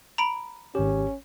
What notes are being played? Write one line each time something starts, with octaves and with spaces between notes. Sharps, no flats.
A#5 B5 D7
G#1 C#4 G4